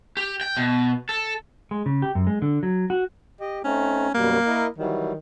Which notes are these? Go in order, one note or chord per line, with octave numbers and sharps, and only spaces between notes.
G4
G5
B2
A4
G#3
C#3
G4
F#2
G#3
D3
F#3
F#4
G4 D#5
A3 C4 C#4 D#4
F#2 B2 G3 A#3
E4 A#4 D#5
D#3 E3 F#3 G3